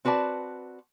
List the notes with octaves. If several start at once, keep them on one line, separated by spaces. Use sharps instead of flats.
C4 F#4 B4 D5 A5